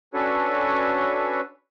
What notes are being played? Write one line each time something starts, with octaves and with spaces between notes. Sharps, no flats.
C#4 D4 F#4 A4 B4 C#5